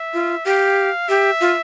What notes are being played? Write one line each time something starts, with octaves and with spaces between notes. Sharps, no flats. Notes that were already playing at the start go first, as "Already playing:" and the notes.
Already playing: E5
F4
G4 F5
G4 E5
F4